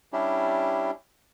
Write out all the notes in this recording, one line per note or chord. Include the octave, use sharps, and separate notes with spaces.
G3 C#4 D4 E4 G4